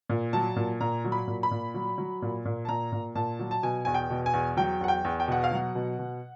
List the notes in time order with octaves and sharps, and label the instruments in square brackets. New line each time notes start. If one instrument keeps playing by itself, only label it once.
[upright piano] A#2
F#3 A5
A#2
A#2 A#5
F#3
B5
A#2
B5
A#2
F#3
F#3
A#2
A#2
A5
A#2 A#5
A#2
A#2 A5
F#3
A5
B2 G#5
E2 G#5
G5
B2
G#5
E2
F#3 G5
E2 F#5
G5
E2
G5
B2 F#5
F5
F#3 F#5
B2
B2